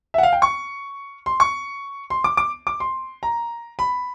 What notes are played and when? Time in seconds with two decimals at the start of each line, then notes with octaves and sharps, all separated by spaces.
0.14 E5
0.18 F#5
0.23 F5
0.33 G5
0.42 C#6
1.26 C6
1.40 C#6
2.10 C6
2.24 D6
2.37 D6
2.67 D6
2.80 C6
3.23 A#5
3.79 B5